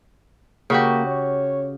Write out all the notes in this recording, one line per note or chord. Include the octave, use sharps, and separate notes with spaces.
C#3 A#3 F#4 G4
C#5